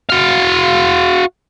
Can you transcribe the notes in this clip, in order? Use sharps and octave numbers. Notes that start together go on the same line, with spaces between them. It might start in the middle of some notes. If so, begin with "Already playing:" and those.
F#4 F5